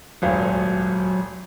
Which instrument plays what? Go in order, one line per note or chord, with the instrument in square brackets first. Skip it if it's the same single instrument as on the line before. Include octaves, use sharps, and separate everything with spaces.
[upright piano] D#1 G#1 D2 [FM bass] F#3